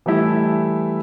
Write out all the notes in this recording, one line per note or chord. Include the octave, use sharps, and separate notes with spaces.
E3 G3 A3 E4